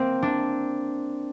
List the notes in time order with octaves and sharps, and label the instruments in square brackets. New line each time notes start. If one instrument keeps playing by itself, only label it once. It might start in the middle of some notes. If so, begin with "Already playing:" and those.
Already playing: [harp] A#3 C4
D4